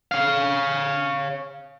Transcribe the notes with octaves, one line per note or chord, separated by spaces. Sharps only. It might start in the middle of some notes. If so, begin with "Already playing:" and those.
C#5 F5